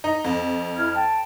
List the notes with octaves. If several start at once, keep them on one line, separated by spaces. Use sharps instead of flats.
D#4
F2
E4 F6 G#6
G5 A5